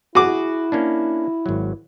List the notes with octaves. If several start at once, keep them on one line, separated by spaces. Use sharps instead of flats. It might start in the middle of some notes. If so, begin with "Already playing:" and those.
E4 F#4 G#4 D6
A#3 C#4 D4
G#1 F#3